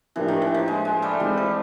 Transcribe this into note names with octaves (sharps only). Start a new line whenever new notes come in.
A2 E3 F3 A#3 D4 G4
D#3
E3
F3
G#3
G#3
G3 A3
E3 G3 G#3 C4
F3